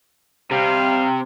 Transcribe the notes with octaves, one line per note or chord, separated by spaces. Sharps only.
C3 G3 F5